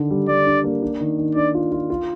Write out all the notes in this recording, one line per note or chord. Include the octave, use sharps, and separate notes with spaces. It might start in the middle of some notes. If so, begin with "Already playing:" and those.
Already playing: D3 D#3 D4
G3
G3 D5
D4
A#3
D4
D#3
D#3
D4 D5
F4
F4
F4